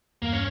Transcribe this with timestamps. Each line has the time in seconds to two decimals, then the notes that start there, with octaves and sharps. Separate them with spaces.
0.22 E2 G2 A#3
0.33 C#4